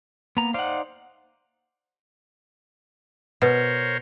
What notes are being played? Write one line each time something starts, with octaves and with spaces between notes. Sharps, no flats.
A#3 B3 A#5
D#4 C5 D5 F5 F#5
B2 A#4 C5 C#5